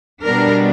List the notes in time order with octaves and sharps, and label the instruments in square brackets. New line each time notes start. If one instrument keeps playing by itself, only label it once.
[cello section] B2 G3 B3 D4 A#4